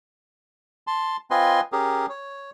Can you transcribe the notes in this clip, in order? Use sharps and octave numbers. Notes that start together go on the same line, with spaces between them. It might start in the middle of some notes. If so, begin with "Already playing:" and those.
A5 C6
C4 F4 B4 D#5 G#5 C6
C#4 G4 G#4 A#4
C#5